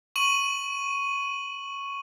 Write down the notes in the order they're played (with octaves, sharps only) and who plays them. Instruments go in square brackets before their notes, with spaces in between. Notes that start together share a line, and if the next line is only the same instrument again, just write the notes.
[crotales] C#6 D#7 F#7